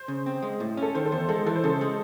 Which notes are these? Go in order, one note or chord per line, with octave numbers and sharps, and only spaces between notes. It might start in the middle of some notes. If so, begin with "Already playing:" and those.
Already playing: C5
C#3
C4
G#3
A2
C#4 A4
D#3 C5
A4
E2 C5
G#3 A4
E3 A4
C5
C#3 A4
G#3